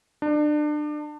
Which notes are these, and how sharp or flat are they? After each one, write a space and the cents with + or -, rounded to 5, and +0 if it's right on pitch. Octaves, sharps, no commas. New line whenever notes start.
D4 +30